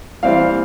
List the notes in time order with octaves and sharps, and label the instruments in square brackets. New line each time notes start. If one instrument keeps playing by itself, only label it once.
[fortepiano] E3 G3 C4 F5